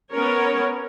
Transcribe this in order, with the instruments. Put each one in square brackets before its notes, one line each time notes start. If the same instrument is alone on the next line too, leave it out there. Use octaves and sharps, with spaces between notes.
[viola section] B3 C#4 A#4 C#5